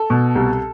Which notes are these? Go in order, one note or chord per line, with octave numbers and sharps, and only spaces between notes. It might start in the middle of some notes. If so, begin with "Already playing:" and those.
Already playing: A4
B2
C2